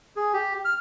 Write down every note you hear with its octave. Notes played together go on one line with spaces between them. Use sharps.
G#4
G4
F6